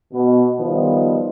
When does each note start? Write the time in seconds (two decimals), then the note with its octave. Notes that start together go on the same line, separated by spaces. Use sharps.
0.13 B2
0.59 D#3 F3 G3 B3 D#4